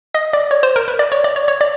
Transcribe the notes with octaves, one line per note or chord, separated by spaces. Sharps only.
D#5
D5
C#5
C5
A#4
B4
D5
C#5
D5
C#5
C#5
D5